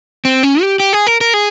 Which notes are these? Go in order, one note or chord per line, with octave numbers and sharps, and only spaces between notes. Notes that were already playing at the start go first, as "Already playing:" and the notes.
C4
C#4
G4
G4
G#4
A#4
A#4
G#4